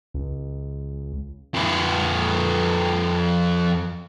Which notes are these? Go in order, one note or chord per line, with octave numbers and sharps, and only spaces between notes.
C#2
F2 B4